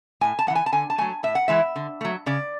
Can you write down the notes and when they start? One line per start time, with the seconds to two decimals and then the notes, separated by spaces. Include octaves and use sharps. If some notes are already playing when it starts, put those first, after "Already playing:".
0.21 A2 G#5
0.39 A5
0.47 E3 G#3 F#5
0.55 G#5
0.66 A5
0.72 D3 G#5
0.90 A5
0.98 F#3 A3 G#5
1.23 A2 E5
1.35 F#5
1.48 E3 G#3 E5
1.76 D3
2.01 F#3 A3
2.26 C#3 D5